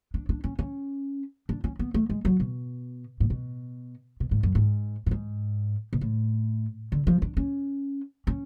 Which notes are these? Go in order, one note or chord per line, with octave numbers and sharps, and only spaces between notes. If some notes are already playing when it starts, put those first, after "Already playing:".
D4
D4
C#4
C#4
D4
C#4
B3
A3
G#3
F#3
B2
A2
B2
B2
G#2
F#2
G#2
A2
G#2
B2
A2
D3
F3
D4
C#4
C#4